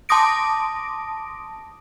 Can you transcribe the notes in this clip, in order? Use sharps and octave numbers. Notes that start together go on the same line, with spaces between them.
A5 C6 D6 D#6 A#6 D7